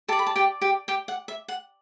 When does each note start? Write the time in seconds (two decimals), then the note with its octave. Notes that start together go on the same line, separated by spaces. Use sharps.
0.08 G4 A4 A5
0.12 D5
0.19 B5
0.27 A5
0.36 G4 G5
0.61 G4 G5
0.88 G4 G5
1.08 F#5
1.28 E5
1.48 F#5